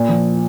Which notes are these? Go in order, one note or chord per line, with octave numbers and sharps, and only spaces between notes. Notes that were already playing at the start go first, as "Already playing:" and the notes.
Already playing: A#2
F3